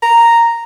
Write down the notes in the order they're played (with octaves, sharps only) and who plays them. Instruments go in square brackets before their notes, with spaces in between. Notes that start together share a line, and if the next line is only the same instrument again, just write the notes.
[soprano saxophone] A#5